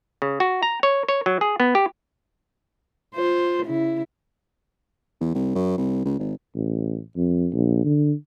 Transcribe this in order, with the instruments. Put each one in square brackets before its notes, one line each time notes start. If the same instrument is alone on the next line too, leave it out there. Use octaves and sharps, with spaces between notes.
[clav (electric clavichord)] C#3
F#4
A#5
C#5
C#5
F#3
G#4
B3
G4
[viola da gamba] F4 C5
C#3 E4
[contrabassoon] E2
C2
F#2
C2
C#2
G#1
[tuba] A1
F2
A#1
D3